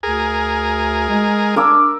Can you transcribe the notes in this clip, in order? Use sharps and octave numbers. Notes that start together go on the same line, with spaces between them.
D2 G#4 A#4
G#3
D4 A#4 D6 E6